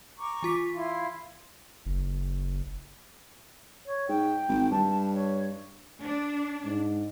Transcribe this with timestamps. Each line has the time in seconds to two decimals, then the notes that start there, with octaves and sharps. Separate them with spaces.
0.18 A#5 C#6 D6
0.43 E3 F4 B6
0.73 E4 F5 C6
1.86 F#1
3.86 C#5
4.09 G#2 G5
4.48 G#1
4.71 G2 A5
5.13 C#5
6.03 D4
6.65 G#2